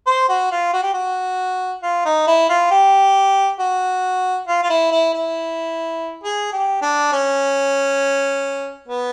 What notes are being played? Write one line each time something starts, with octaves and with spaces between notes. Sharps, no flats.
C5
F#4
F4
F#4
G4
F#4
F4
D#4
E4
F4
G4
F#4
F4
F4
E4
E4
E4
G#4
G4
D4
C#4
B3